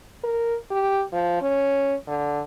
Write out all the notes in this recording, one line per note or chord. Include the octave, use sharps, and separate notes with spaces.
A#4
G4
F3
C#4
D3